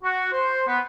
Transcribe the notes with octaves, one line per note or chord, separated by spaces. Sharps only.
F#4
C5
B3